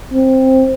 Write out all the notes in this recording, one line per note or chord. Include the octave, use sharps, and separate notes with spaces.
C4